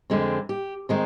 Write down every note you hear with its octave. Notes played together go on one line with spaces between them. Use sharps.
F2 D3 G#3 C4
G4
D#3 G#3 C4